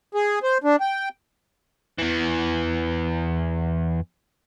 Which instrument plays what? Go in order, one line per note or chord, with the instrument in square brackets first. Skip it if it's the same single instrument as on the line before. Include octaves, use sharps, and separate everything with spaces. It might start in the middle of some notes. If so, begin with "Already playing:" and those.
[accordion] G#4
C5
D4
G5
[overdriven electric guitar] E2 E3